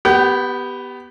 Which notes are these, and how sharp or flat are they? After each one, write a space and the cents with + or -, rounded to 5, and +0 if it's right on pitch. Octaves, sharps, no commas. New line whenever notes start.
B3 +0 G4 +0 F#5 +40